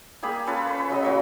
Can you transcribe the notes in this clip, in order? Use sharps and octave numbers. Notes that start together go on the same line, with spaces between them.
G3 A#3 G#4 B5
C#4 F4 A4 B4
B4
C#3 F#3 D#5
A#2 F#3 C#6